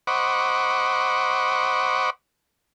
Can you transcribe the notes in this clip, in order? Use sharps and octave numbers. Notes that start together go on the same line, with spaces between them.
C5 D#5 F#5 B5 C#6 D6